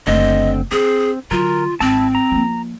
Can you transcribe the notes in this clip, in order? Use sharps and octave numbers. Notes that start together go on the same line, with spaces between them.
F#1 D3 A3 C4 D#5
C4 D4 G#4
D3 F#3 F4 A#4
G#1 C4 E4 A5
A#5
F3 A#3